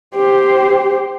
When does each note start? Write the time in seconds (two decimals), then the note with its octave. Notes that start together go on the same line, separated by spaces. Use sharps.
0.15 G4 C5